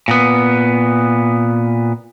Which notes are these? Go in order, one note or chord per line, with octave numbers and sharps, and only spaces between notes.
A#2 B3